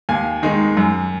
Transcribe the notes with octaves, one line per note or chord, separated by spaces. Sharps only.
D#2 F5 G#5
D#3 G#3 D#4
F#2